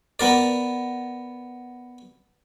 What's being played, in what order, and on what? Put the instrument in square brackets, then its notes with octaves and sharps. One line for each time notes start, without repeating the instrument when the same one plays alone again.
[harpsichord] B3 A#4 D5